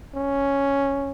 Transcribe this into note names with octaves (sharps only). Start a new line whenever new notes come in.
C#4